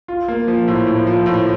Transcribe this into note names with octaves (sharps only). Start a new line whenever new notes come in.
F4
A#3
F3
A2
A2
F3
A2